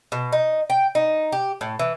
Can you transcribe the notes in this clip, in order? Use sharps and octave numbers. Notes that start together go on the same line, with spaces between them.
B2
D#4
G5
D#4
G4
A2
E3